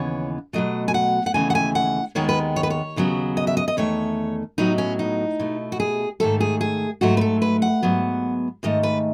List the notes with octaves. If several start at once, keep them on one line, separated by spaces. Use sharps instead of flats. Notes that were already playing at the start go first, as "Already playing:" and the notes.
Already playing: D#2 C#3 E3 B3 C#5
B2 F#3 A3 D#5
G#5
F#5
F#5
D#2 C#3 E3 A3 G#5
F#5
G#5
F#5
D#2 D#3 G#3 B3 C#5
B4
C#5
B4
C#5
D#2 C#3 F#3 B3
D#5
E5
D#5
D#5
E2 D#3 A3 C#5
A2 F#3 B3 D#4
C#4
D#4
B2 A3
F#4
G#4
G#2 D#3 A3 A4
G#4
G#4
G#2 F#3 A3 F#4
B4
A4
B4
F#5
G#2 F#3 B3
G#2 D#3 A3 D#5
B4